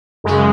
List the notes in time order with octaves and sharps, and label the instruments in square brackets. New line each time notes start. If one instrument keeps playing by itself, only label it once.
[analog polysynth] F#2 C#3 G#3